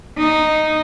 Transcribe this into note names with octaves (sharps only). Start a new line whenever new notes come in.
D#4